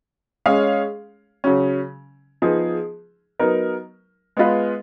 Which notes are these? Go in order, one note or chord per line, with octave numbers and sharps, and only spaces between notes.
G#3 C#4 G#4 C#5 F5
C#3 F#3 C#4
F3 B3 D#4 G#4
F#3 B3 D#4 A#4
G#3 B3 F4 B4 D#5